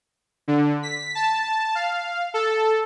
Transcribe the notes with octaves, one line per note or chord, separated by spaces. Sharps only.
D3
B6
A5
F5
A4